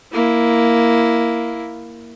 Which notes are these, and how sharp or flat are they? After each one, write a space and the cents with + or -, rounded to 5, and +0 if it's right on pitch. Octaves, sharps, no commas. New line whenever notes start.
A#3 +0 E4 +0